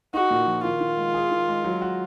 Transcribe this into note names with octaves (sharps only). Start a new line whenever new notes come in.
D#4 F#4
A#2
F3
D#3 F4
D#3
G#3
G#4
D#3
G#3
F#3
F#4